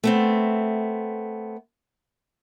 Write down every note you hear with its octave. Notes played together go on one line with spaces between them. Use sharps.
A3 B3 C4